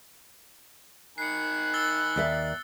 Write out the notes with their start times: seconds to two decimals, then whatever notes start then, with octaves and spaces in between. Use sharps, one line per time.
1.18 D#3 G#5 B5 F#6 C7 C#7
1.74 E6 A6 G7
2.16 D#2 D5 E5